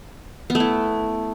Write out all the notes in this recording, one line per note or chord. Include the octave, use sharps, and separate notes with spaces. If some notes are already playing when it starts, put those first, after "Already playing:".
B3
A3
E4